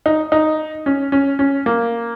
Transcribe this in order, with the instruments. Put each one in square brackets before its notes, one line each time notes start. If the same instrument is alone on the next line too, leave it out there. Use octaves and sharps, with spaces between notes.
[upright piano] D#4
D#4
C#4
C#4
C#4
A#3